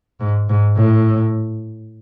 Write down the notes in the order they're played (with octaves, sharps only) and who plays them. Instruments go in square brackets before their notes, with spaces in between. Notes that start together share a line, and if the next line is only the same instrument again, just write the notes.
[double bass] G#2
G#2
A2